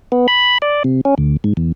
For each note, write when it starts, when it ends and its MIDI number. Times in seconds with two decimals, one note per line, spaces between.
0.12 0.27 59
0.28 0.58 83
0.62 0.83 74
0.84 1.01 48
1.05 1.15 61
1.18 1.36 38
1.44 1.53 44
1.57 1.72 40